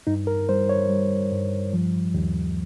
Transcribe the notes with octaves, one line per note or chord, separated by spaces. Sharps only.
G2 D#4
A#4
G3 C5
C#5
G3
G2
F3
D#2